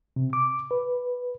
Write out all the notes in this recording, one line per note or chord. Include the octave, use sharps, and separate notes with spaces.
C3
D6
B4